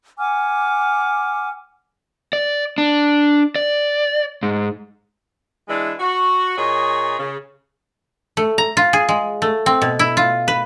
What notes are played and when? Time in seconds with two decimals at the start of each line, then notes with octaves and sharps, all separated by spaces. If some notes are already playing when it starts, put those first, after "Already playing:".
0.19 F#5 G#5 D6 F6
2.33 D5
2.78 D4
3.56 D5
4.43 G#2
5.68 E3 G#3 D4 E4
5.98 F#4
6.57 A#2 G#4 C#5 D#5
7.18 C#3
8.37 A3
8.58 A#5
8.77 F4
8.93 G#4
9.09 G#3
9.42 A3
9.66 C4
9.82 B2
9.99 E4
10.17 F4
10.48 B4